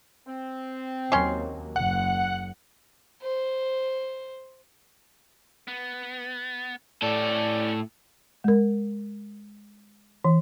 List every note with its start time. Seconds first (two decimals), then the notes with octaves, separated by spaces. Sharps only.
0.27 C4
1.12 D#2 F#3 A#3 C#4 C6
1.76 F#1 F#5
3.22 C5
5.68 B3
7.02 A2 C#4 G4 A4 D5
8.44 G#3 A#4
10.25 E3